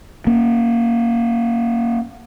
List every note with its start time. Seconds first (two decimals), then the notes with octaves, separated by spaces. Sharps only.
0.27 A#3 C#4